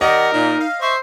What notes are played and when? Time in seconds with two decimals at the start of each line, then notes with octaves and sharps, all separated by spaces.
0.01 D#3 G4 A#4 D5 D#5 F#5
0.33 A#2 D#4
0.60 F5
0.81 C5 E5 C#6